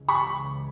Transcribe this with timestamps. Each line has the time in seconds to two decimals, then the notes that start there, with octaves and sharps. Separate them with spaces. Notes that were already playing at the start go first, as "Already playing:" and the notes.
Already playing: C#2 C#3 E3 G#3
0.08 B5 C#6